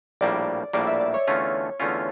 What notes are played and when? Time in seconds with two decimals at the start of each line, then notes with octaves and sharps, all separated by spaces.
0.21 A#1 A2 G3 A#3 D5
0.73 A#1 A2 G3 A#3 D5
0.87 E5
1.00 D5
1.14 C#5
1.27 E2 D3 A3 C#4 F4
1.80 E2 D3 A3 C#4 F4